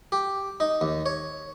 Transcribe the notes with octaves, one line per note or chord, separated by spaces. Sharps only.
G4
D#4
D#2
C#5